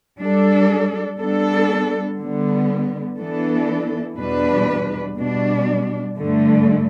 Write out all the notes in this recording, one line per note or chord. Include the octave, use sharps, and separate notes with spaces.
G3 D4 A4
G3 B3 D4 A4
D3 G3 B3
E3 B3 D4 A4
E2 B2 G3 D4 B4
B2 G3 D4
G2 D3 A3